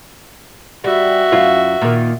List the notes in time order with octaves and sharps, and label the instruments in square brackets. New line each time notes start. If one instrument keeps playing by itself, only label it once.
[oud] G3 [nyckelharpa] F#4 E5
[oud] F#2 C#4 F4
A#2 D#3